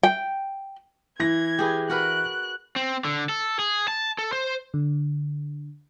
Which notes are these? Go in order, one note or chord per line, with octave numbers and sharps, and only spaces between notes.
G5
E3 G#6 A#6
G4 G#4 B4
F#4 A#4 B4 F#6
C4
D3
A4
G#4
A5
A4
C5
D3